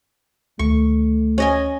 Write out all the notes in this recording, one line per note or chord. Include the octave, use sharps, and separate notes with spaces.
D2 D#3 A3 C#6
C#4 D#5 G#5